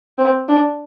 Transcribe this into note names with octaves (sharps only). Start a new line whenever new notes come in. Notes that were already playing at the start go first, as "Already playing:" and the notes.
C4
D4